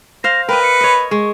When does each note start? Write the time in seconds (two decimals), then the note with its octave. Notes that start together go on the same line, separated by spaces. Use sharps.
0.24 C5 F5 A#6
0.49 A#4 B4 D#5 G5
0.63 C#7
0.81 C#5 D#5
1.11 G#3 C#6